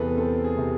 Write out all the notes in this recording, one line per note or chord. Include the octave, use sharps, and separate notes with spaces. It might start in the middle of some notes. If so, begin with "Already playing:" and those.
Already playing: E2 C3 G#4 A4 B4
C4 A4
G#4
C3